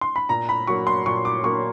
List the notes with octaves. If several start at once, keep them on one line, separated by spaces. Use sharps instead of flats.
C6
B5
A#2 A#5
B5
F#3 A#3 C#6
C6
A#2 C#6
D6
F#3 A#3 C#6